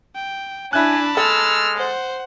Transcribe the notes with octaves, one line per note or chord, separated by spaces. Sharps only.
G5
D4 E4 G#5 A5 B5 F#6
G#3 A4 E6 F6
C5 F#5